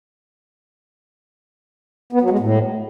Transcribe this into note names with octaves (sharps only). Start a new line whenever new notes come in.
B3
F#3
G#3
A2